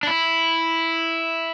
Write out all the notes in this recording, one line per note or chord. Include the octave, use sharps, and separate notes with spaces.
D4
E4